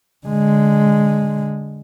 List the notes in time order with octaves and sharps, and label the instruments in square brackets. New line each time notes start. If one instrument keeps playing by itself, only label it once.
[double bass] D3 G#3